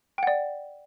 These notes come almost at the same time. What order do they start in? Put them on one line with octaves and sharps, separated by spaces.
G5 F#5 D5